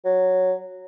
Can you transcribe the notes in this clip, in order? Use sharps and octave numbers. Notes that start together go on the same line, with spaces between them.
F#3